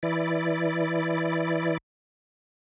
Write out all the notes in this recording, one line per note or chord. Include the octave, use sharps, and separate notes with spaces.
E3 E4 D5